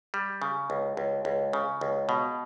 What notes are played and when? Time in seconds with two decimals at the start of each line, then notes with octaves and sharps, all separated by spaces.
0.14 G3
0.42 C#3
0.70 C#2
0.97 C#2
1.25 C#2
1.53 C#3
1.81 C#2
2.09 B2